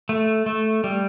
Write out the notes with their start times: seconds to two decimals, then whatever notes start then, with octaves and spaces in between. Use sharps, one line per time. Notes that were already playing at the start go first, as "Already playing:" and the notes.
0.09 A3
0.46 A3
0.84 G3